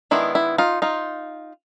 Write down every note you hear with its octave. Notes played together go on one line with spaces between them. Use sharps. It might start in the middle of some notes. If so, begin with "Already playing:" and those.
D#3 G#3 B3 D4 E4
E4
D#4 F4
D#4 F4